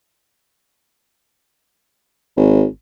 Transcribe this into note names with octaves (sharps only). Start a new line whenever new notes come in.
G#1